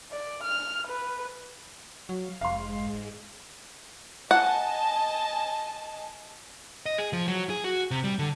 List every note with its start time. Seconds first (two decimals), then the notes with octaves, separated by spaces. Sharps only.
0.12 D5
0.44 F6
0.88 B4
2.09 F#3 F5
2.41 F1 G#2 G#3 F5 C6
4.31 D#5 F#5 G#5 A5
6.86 D#5
6.98 G#4
7.13 F3
7.28 F#3
7.50 G#4
7.64 F#4
7.91 C3
8.04 G3
8.19 D3